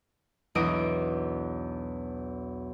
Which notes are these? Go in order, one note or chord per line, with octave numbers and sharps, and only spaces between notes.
B1 E2 D4 D#4 D#5 D7